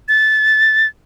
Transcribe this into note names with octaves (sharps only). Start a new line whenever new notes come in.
A6